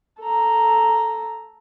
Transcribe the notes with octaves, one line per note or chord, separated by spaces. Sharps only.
A4 A#5